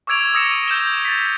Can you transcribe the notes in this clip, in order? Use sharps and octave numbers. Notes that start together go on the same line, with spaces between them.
C#6 D6 E6 G#6 D7 F7
D#6 E6 A#6 C#7 E7
D#7
G6 E7 G7
A6 B6